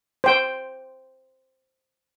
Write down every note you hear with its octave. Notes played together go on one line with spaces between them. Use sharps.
C5 G5